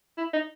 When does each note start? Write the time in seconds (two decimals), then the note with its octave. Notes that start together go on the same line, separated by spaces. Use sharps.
0.17 E4
0.33 D#4